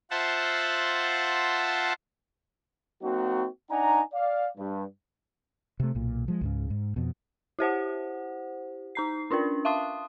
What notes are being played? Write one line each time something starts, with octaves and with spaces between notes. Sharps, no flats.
F4 C5 E5 F#5 A5
F#3 A#3 C4 D#4 F#4
D4 D#4 D5 F#5 G#5 A#5
D5 F5
G2
C3 A3
B1 A#2
F3 G#3
C#2 G#2 C#3
G#2
F2 B2
E4 G4 C5 F#5
D#4 A#5 C7
C#4 D4 F4 A#4
E5 F5 A5 C6 D#6